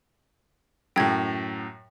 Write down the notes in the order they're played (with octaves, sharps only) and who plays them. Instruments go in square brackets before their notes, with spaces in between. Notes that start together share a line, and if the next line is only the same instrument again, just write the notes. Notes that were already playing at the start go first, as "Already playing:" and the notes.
[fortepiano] F#2 A2 [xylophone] G5 G#6